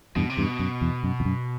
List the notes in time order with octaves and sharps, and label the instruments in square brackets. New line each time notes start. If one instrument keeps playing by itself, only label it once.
[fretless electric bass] E2 G2 [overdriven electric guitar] B2
[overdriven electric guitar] C3
[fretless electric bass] E2 G2
[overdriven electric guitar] B2
[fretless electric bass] F#2
E2
F#2
E2
F#2